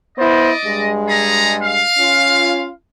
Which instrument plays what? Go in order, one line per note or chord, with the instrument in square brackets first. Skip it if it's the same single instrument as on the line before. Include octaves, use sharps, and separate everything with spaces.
[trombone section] B3 E4 C5 [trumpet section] D5 D#5
[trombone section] G2 G#3
[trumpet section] G#4 A4 A#5
F5
[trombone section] C#4 F4